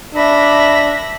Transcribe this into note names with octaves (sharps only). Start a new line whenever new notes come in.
D4 E5 B5 A#6